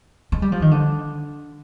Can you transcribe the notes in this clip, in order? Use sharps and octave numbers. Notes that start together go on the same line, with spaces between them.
G#3
G3
F3
D#3
D3